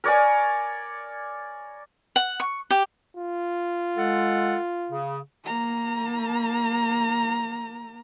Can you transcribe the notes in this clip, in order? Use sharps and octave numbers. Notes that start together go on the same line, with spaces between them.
A#4 C#5 D5 G#5
F#5
C#6
G4
F4
G#3 A4 F#5
C#3
A#3 A#5